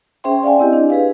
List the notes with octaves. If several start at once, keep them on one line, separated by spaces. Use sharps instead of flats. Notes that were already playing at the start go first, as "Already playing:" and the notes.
C#4 G#4 C5 E5 G5 C6
D5 F5 G5 G#5
C4 E4 G4 D#5
D4
G#4 B4 F5